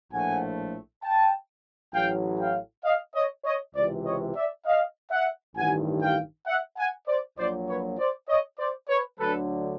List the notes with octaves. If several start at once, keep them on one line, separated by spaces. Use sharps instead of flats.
A#1 A2 F3 A3 F#5 G#5
G5 A5
A1 A2 F#3 F5 G5
F5 G5
D#5 F5
C#5 D#5
C#5 D#5
C#2 C3 E3 C5 D5
C#5 D#5
D5 E5
D#5 F5
E5 F#5
A1 G2 D#3 F#5 G#5
F5 G5
E5 F#5
F#5 G#5
C5 D5
A#1 A#2 F#3 C5 D5
B4 C#5
C5 D5
C#5 D#5
C5 D5
B4 C#5
D2 D3 F#3 A4 B4